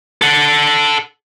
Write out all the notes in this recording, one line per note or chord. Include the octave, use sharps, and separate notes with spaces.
A4 F#5